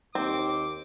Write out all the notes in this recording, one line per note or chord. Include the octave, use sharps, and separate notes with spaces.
D#2 C4 D6